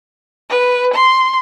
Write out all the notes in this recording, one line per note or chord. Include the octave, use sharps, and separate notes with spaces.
B4
C6